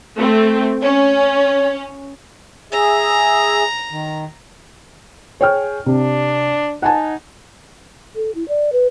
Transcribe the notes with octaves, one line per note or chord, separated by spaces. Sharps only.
A3 C4
C#4 C#5
G#4 E5 A#5
D#3
G#4 C#5 G5 F6
C3 D4
D#4 F#5 G#5 A5
A4
E4
D5
B4